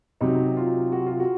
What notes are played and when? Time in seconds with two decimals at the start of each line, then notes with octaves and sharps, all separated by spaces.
0.21 C3 F#3 D#4
0.57 F4
0.92 F#4
1.06 F4
1.20 F#4